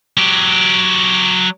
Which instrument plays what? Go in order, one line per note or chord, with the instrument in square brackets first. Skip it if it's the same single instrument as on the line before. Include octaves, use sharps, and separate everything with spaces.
[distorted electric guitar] F#3 G4